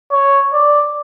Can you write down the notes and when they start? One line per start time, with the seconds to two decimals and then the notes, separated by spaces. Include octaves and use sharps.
0.12 C#5
0.53 D5